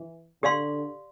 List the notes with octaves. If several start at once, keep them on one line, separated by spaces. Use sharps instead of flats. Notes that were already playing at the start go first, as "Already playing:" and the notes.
Already playing: E3
D3 G4 D5 F5 C6